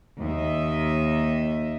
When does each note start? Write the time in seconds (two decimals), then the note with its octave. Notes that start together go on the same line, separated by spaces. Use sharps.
0.19 D#2 D#5 E5